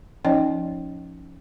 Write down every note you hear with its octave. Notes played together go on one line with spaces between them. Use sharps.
F3 C#4 D#4 D5 D#5 G5